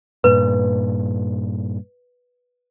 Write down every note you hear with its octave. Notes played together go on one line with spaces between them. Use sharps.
G2 A#2 B4